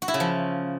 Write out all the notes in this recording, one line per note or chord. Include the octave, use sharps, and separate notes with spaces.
F#4
E4
C#3
F3